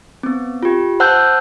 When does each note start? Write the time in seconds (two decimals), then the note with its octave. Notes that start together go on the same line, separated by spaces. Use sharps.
0.23 B3 C4
0.63 F4 G4
1.00 C5 F#5 A5 E6 F#6 G6